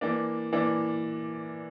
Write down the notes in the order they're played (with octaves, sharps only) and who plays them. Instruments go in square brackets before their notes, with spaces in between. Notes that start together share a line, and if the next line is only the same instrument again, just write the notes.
[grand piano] E3 A#3 D4
E3 A#3 D4